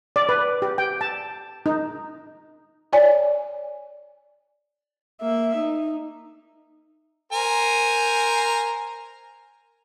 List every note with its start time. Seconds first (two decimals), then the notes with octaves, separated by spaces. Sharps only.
0.16 D5
0.29 B4
0.62 G4
0.78 G5
1.01 A5
1.66 D#4
2.93 C#5 D5 G#5
5.21 A#3 E5
5.57 D#4
7.32 A#4 C5 G#5